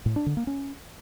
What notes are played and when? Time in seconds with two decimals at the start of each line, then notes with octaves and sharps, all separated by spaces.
0.06 A2
0.16 D4
0.26 D3
0.37 A#3
0.47 C#4